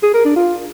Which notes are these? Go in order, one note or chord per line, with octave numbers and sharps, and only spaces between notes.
G#4
A#4
D4
F4